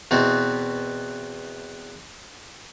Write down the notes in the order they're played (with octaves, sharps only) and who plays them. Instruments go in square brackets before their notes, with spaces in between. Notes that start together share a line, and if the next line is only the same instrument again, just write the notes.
[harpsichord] E2 B2 E3 C4